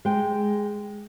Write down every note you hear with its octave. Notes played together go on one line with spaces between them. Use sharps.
G#3 G5